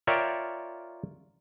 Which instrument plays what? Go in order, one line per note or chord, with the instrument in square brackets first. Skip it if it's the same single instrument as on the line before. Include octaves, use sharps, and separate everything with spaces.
[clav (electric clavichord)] F4 A#4 C#5 D5 E5 G5